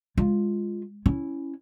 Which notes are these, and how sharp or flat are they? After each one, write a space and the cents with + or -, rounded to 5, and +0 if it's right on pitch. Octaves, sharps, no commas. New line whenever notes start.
G#3 -15 F4 +0
C#4 +0 E4 +0